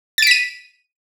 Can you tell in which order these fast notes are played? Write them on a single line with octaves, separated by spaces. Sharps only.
A6 D7 B6 D#7